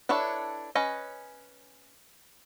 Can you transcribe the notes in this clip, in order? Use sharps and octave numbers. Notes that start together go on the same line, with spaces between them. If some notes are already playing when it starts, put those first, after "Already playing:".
D4 E4 A4 B4 C#5
C#4 B4 C#5 D#5